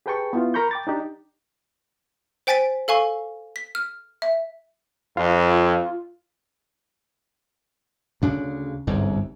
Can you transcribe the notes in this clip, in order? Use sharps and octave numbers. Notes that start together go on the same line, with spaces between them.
G4 G#4 B4 G5 A5 C#6
B3 E4 F4
A#4 A#5 B5 C#6 G6
G5 D6 A6
D4 D#4 G4
C5 G5 G#5 A6 B6 D7
A4 F5 G#5 C#6
B6
F6
E5
F2 F4
D2 C#3 D4
G1 C2 G#2